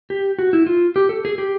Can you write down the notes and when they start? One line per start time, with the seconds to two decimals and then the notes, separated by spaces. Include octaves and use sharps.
0.10 G4
0.39 F#4
0.53 E4
0.66 F4
0.96 G4
1.09 A4
1.25 G#4
1.38 G4